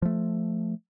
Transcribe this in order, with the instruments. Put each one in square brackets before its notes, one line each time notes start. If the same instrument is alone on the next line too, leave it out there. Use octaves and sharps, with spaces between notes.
[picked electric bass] F3 A3